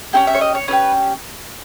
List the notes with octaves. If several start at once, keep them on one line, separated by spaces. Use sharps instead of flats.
C#4 E4 G4 G5
E5
C#5
D#5
C#5
C#4 E4 G4 B4